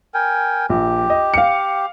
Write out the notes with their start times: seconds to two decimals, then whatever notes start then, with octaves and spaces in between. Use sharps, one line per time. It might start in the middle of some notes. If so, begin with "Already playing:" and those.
0.14 A#4 G5 G#5
0.69 A#1 G4
1.10 D#5
1.34 F5 C#7